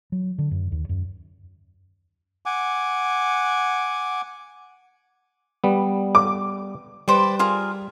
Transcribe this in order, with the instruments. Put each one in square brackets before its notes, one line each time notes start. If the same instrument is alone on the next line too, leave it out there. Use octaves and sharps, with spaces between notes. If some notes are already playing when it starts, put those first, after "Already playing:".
[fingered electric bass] F#3
D3
F#2
D#2
F#2
[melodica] F#5 G#5 D6
[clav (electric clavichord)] G3 B3
[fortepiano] D6
[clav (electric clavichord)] G3 [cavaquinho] B4 C5 D5
[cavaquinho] F4 G#4 A#4